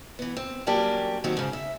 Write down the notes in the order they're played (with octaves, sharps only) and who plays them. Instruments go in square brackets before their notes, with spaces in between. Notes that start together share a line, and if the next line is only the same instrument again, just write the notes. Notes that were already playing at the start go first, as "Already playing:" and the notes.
[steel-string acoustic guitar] E3 B3
C4
C#3 F#3 G3 A#3 D4 G4
A#2 D#3 F#3 C4 F#4
G#2 C#3
E5